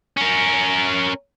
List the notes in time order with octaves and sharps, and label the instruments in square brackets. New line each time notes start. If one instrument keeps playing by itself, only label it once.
[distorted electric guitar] C#4 A#4